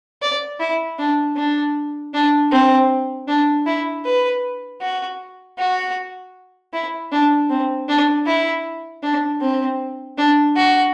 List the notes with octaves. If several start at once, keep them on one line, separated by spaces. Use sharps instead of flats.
D5
E4
D4
D4
D4
C4
D4
E4
B4
F#4
F#4
E4
D4
C4
D4
E4
D4
C4
D4
F#4